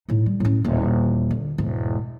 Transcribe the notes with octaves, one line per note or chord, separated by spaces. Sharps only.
A2 D#4
G3
A2 C#4
D#1 E2
D3
E1 G#2